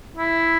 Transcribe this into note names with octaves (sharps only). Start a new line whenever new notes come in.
E4